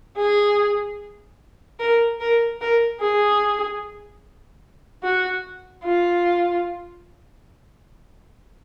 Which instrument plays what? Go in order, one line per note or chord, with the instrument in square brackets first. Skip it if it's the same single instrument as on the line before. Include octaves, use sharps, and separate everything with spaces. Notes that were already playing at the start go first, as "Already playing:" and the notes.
[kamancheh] G#4
A#4
A#4
A#4
G#4
F#4
F4